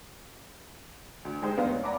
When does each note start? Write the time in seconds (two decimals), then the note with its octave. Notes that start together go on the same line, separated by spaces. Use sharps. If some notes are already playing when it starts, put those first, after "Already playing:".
1.25 D2
1.42 G#3 D#4 G4 C5
1.58 F1 B3 D4 D#4 F5
1.70 C#5
1.84 D5 F#5 A#5 B5 D6